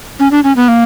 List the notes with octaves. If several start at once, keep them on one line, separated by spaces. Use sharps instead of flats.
C#4
D4
C#4
B3
A#3